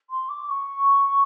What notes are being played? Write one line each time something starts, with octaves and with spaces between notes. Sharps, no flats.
C6
D6
C#6